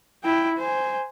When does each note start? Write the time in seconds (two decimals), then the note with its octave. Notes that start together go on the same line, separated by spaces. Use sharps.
0.23 E4 G5
0.57 C5 G#5